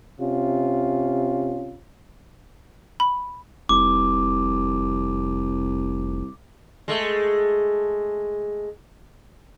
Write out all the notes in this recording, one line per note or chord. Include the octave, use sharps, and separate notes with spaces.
C3 C#4 F4
B5
F1 C2 D6
G#3 A3